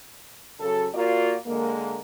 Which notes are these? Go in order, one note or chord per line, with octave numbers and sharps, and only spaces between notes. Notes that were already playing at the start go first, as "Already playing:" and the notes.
C#3 F#3 A4
A#3 F4 F#4 A#4 D5
D3 G#3 A#3